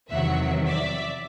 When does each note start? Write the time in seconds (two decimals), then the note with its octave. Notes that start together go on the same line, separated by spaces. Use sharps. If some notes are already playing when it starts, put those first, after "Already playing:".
0.11 E2 C3 D#3 F#3 E5 F#5
0.66 D5 E5